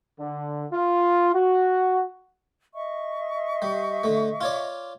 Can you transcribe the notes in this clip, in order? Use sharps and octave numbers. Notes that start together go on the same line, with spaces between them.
D3
F4
F#4
D#5 E5 C#6
G3
D3 A3
F4 C#5 D5